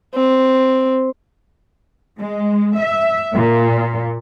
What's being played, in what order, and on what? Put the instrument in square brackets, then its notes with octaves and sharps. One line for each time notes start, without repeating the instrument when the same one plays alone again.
[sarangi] C4
[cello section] G#3
E5
A#2